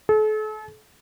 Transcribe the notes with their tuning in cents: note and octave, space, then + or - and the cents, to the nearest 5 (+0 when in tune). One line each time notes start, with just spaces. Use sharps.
A4 -40